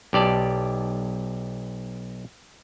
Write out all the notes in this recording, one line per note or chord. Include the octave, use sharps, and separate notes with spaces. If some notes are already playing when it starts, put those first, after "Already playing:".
B1 G4 D5 A5